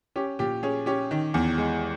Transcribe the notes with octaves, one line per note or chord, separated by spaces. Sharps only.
C#4 G4
A#2 G4
C#4 G#4
C#4 G4
D#3
E2
G#3